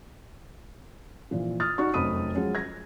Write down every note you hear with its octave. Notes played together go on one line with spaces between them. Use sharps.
A#2 E3 F3
D#6 F6 A6
D#4 F#4 D5 C#6
F1 F#2 C4 B5 D#6 D#7
F3 F#3 G#3 C#4
G#6 A#6